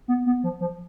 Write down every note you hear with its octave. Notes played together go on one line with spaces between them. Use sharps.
B3
B3
F3
F3